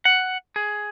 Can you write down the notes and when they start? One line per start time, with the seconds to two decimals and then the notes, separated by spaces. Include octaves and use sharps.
0.05 F#5
0.56 G#4